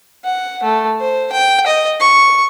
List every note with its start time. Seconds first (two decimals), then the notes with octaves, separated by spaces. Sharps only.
0.24 F#5
0.63 A3
1.00 C5
1.32 G5
1.66 D#5
2.00 C#6